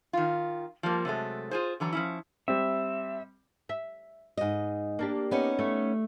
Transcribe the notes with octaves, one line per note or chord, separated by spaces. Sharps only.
D#3 F4
F3 G3 A#3
C3 F#3 G#3 A3
F4 G#4 C5
D3 E3 F#3 A#5
F3 C#4 E4
G3 C4 E5
E5
G#2 D#5
A#3 D4 G4
B3 C#4 D#4
A3